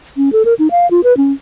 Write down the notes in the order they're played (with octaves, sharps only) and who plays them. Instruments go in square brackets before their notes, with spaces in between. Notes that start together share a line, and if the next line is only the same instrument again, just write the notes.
[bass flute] C#4
A4
A#4
D#4
F5
F4
B4
C#4